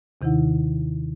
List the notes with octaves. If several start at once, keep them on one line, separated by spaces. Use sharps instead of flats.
D#2 C3 D#3 D#4 E4 F#5